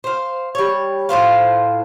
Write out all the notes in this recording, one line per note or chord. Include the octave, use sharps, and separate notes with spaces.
C5 F5
G3 C#5
A2 F4 C5 F5